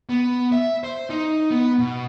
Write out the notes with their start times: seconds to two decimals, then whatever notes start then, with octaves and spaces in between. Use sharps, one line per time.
0.09 B3
0.52 E5
0.84 C5
1.10 D#4
1.51 B3
1.79 B2